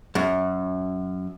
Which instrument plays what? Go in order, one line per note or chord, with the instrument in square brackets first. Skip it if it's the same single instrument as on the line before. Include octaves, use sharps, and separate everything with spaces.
[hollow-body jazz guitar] F#2